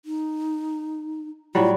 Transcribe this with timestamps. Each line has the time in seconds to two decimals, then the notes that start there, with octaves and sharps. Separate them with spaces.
0.05 D#4
1.55 A2 F#3 G3 F4